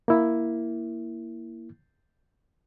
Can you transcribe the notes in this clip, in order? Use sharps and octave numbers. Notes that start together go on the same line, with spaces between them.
A#3 E4